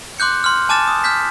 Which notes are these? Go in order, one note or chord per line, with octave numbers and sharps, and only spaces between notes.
C6 D6 F#6 G6 C#7
C6 F6
G#5 A5 D6 F6 A6 E7
D#6
F6 G6 B6